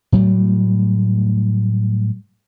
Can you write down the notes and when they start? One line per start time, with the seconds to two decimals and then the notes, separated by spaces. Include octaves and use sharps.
0.12 A2 F#3 G3 A3